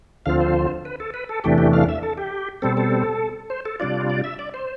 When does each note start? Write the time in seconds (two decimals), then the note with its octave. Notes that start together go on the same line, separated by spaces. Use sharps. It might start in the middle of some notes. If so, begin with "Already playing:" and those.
0.26 D2 D3 F3 C4 F4 F5
0.40 C5
0.85 B4
1.00 A4
1.14 B4
1.29 A4
1.44 E2 C3 E3 A3 D4 G4
1.58 G4
1.73 F5
1.89 E5
2.03 A4
2.18 G4
2.62 B2 G3 C4 A4
2.77 A4
3.50 C5
3.65 A4
3.80 C3 G3 D4 F4 D5
4.10 D5
4.24 E5
4.39 D5
4.54 C5